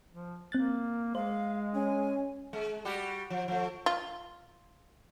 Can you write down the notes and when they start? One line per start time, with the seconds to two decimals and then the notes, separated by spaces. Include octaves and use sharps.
0.11 F3
0.52 A#3 C4 F#6 A6
1.15 G#3 C5 F5
1.75 C#4 G#5
2.53 G#3
2.85 G3 F#4 G4
3.30 F3
3.48 F3 A3
3.86 F4